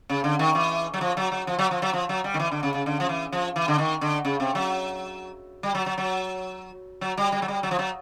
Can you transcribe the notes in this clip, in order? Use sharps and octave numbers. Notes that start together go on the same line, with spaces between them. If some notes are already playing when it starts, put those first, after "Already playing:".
C#3
D3
D#3
E3
F#3
F3
F#3
F#3
F3
F#3
F3
F#3
F3
F#3
G3
D#3
E3
D3
C#3
C#3
D3
F3
E3
F3
E3
D3
D#3
D3
C#3
C3
F#3
G3
F#3
F#3
F#3
F#3
G3
G3
F#3
G3
F#3
F3
F#3